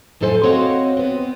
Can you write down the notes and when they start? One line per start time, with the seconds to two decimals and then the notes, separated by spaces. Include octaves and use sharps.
0.21 F2 A2 F#3 A4 C5 G#5
0.43 C4 F#4 C#5 D#5 F5 F#5
0.97 B3 C4